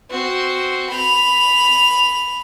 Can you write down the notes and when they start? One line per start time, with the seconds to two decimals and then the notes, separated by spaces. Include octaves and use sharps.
0.11 C4 F#4
0.91 B5 F7